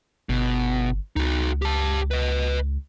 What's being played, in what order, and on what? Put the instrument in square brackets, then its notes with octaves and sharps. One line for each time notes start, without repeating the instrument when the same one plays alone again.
[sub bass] G1 [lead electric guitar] B2
[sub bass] C#2 [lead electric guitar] D#4 F#4
[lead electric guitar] G4 A5
B4 D#5